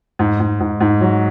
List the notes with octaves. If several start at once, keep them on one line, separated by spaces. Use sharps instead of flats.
G#2
G#2
G#2
G#2
F#3